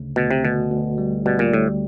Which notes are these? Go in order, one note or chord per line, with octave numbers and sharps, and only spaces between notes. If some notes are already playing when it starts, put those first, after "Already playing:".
Already playing: D2 C#3
D2 B2
C3
D2 B2
D2
G3
B2 G3
A#2
D2 A2